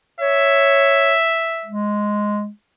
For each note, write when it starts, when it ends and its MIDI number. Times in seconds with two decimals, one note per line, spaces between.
0.21 1.15 73
0.21 1.74 76
1.66 2.49 56